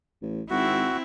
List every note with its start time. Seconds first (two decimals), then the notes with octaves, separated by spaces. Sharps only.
0.22 A1
0.50 G#1 C4 E4 F#4